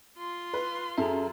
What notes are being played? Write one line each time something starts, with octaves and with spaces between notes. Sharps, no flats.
F4 C6
B4
F#2 G#4 A4 E5